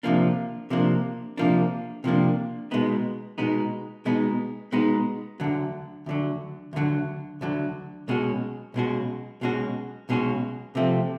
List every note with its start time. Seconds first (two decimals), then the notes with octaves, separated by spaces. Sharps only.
0.03 C3 F3 A#3 D4
0.70 C3 F3 A#3 D4
1.37 C3 F3 A#3 D4
2.04 C3 F3 A#3 D4
2.71 B2 G#3 B3 D#4
3.38 B2 G#3 B3 D#4
4.05 B2 G#3 B3 D#4
4.72 B2 G#3 B3 D#4
5.40 D2 D3 F#3
6.06 D2 D3 F#3
6.73 D2 D3 F#3
7.41 D2 D3 F#3
8.08 B1 B2 G#3 C#4 F#4
8.74 B1 B2 G#3 C#4 F#4
9.41 B1 B2 G#3 C#4 F#4
10.09 B1 B2 G#3 C#4 F#4
10.75 C3 F3 A3 C4